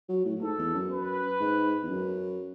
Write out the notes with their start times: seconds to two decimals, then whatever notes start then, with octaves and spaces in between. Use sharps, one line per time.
0.09 F#3
0.25 A2
0.36 A2
0.42 G#2 A4
0.59 E2
0.74 F#2
0.91 B4
1.40 G#2
1.83 E2
1.90 F#2